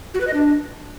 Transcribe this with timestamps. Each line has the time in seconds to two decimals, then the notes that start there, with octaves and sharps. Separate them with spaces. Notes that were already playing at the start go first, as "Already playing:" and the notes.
0.14 F#4
0.21 B4
0.27 D#5
0.34 D4